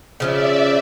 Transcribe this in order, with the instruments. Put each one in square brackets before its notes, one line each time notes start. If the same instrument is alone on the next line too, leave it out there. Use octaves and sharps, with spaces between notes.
[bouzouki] C#3 F3 C#4 [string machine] D5 E5